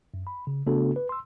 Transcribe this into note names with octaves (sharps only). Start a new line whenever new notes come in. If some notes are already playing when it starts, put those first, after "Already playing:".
F#2
B5
C#3
C#3 A3 B3 D4 F#4 A4
B4
C6 E6